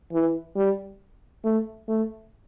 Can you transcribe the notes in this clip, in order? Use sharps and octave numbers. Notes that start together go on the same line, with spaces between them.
E3
G3
A3
A3